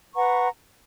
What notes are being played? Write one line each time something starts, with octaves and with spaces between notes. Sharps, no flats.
B4 F#5 A#5 C#6